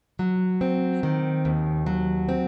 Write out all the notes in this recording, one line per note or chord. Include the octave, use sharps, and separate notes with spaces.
F#3
C4
D#3
D#2
F#3
C4